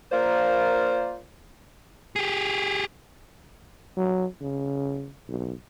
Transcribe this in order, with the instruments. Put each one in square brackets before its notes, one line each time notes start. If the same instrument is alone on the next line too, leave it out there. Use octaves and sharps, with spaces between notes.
[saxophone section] A#3 F4 A#4 C5 D5
[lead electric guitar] G4 G#4
[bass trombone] F#3
C#3
B1